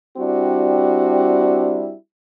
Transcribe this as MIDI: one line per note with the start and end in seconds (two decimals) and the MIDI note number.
0.18 1.94 55
0.18 1.94 60
0.18 1.94 62
0.18 1.94 64
0.18 1.94 66